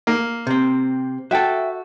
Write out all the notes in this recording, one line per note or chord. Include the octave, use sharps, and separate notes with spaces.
A#3
C3 C4
F#4 A4 E5 G5